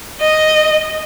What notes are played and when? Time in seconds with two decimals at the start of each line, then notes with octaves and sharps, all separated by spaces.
0.21 D#5